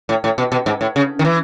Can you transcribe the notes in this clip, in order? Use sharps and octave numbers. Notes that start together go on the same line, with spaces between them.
A2
A2
B2
B2
G#2
A2
C#3
D#3
E3